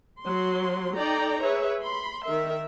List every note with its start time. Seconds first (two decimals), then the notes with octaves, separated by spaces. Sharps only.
0.22 F#3 C6
0.96 D#4 A4 D5 G5 A#5
1.41 G#4 B4 C#5 E5
1.82 B5 C6
2.24 D#3 A#4 E5